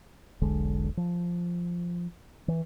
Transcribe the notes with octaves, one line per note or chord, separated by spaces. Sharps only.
E1 B1 D3 G#3
F3
E3